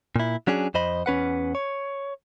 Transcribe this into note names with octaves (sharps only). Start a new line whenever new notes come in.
A#2 E4
F#3 C#4 D4 G#4
F2 C5 D#5 B5
E2 C#4 B4 F#5
C#5